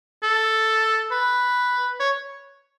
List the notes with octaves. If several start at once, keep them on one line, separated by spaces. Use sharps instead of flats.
A4
B4
C#5